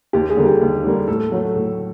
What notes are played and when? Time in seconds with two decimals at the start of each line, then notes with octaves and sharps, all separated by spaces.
0.13 D#2 G4
0.30 G#4
0.37 D3 G3 A#3
0.45 G4
0.61 D#2
0.85 D3 G3 A#3
1.08 A2 A4
1.32 F#3 A3
1.56 A2